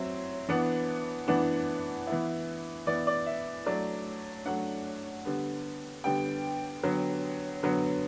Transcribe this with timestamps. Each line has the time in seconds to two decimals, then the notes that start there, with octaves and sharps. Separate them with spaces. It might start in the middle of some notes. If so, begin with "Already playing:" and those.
Already playing: F#3 C4 E4
0.49 E3 B3 D4 F#5
1.28 E3 B3 D4 F#5
2.07 E3 B3 E4
2.87 E3 B3 E4 D5
3.07 D5
3.26 E5
3.66 F#3 A3 D4 D5
4.45 F#3 A3 D4 F#5
5.25 D3 G3 B3
6.04 D3 G3 B3 G5
6.84 D3 F#3 B3
7.63 D3 F#3 B3